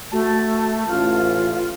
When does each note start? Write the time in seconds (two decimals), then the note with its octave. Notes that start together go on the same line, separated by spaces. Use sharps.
0.12 A3 F#4 A5
0.88 A1 F4